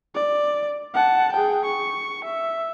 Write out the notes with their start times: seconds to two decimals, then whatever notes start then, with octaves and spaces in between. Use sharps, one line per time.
0.15 D5
0.94 F#5 A5
1.32 G#4 G5
1.65 C#6
2.24 E5